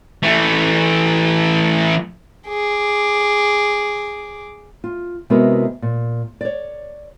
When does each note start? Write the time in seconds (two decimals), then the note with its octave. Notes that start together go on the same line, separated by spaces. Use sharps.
0.23 E3 A3
2.48 G#4 D6
4.84 F4
5.30 C3 G#3 B3 E4 F#4 A#4
5.82 A#2
6.41 C#5 D5